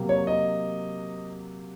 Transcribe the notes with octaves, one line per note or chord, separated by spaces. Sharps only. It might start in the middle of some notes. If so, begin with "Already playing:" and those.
Already playing: C3 F#3 A#3
C#5
D#5